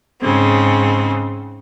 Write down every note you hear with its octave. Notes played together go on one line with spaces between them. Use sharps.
G#2 C#3 C4